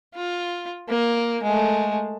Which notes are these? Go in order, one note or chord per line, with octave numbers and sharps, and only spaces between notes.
F4
A#3
G#3 A3